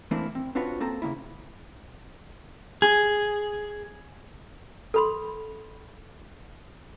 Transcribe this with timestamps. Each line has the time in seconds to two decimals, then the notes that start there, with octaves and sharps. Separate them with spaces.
0.11 E3 A3 A#3 C4 D4 E4
0.35 C4
0.55 C4 D4 F4 F#4 B4 C#5
0.80 A#3 C4 A4 A#5
1.02 C#3 G#3 A#3 E4
2.82 G#4
4.94 A4 B5 C6